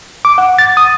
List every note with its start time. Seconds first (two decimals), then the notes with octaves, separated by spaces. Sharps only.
0.25 D6
0.38 F#5
0.59 A6
0.77 D#6